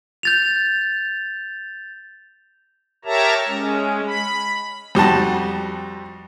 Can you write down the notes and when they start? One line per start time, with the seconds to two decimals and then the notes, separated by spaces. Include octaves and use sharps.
0.23 G6 A6 F7
3.05 G4 A#4 C#5 E5 A5 A#5
3.48 G#3 C#4
4.06 B5
4.95 F2 G3 F#4 A5